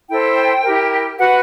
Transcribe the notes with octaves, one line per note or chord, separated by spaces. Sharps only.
E4 A4 C5 G5
E4 G4 A#4
F#4 B4 F#5